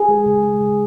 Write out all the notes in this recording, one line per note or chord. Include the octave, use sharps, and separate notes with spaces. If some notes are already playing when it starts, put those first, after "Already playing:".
Already playing: G#4
G#3
C#3
G#3
C#3